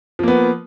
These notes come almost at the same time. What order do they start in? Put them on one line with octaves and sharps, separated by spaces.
F3 A#3 B3